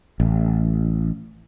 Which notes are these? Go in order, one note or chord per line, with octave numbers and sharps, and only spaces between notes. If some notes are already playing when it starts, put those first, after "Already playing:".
A1